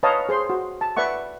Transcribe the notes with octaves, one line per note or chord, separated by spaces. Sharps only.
B4 C#5 D#5 F5 A5 A#5
G#4 C5 C6
F#4
A5
B4 D5 E5 F#5 C#6